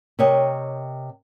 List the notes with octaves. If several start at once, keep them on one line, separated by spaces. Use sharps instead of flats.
C3 A#4 C#5 D#5 G5